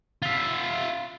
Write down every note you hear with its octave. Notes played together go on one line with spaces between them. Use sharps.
F4 E5